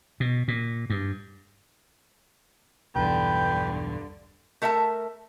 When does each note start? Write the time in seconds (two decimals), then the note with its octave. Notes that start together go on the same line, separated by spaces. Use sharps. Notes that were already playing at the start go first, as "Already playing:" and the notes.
0.20 B2
0.48 A#2
0.90 G2
2.96 B1 E2 G2 D3 B4 G5
4.62 A3 A#4 E5 F#5 A5